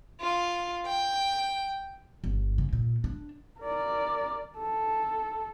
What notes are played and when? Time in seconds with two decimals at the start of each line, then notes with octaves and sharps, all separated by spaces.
0.21 F4
0.87 G5
2.24 G1
2.58 C#3
2.73 A#2
3.04 D4
3.60 A#4 D5
4.58 A4